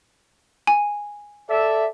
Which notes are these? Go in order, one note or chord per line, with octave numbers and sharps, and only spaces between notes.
G#5
A4 D5 E5